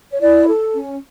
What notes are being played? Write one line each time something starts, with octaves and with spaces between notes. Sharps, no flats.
C#5
E4 D5
A4
C#4